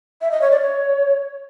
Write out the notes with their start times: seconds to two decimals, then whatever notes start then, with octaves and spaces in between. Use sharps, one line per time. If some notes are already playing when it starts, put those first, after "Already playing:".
0.21 E5
0.31 D#5
0.41 C#5
0.51 D5
0.61 C#5